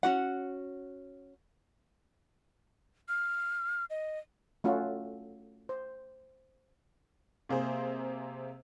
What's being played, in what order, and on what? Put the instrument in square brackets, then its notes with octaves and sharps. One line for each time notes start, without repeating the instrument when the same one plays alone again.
[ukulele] C#4 F#4 F#5
[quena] F6
D#5
[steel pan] A3 C#4 F4 F#4 A4
C5
[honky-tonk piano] C3 A#3 G#4 C5